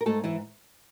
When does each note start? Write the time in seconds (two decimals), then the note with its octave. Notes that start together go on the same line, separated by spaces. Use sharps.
0.01 A#4
0.06 G#2 A3 A4
0.24 E3 E4